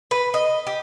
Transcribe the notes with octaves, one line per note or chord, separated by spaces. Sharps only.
B4
D#5
G4